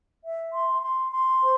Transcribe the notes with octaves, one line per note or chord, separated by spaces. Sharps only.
E5
C6
C6
C6
C5